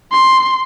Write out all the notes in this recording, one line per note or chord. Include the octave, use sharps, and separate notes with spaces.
C6